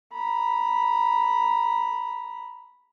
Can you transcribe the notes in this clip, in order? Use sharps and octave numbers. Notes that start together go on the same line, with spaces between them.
A#5 B5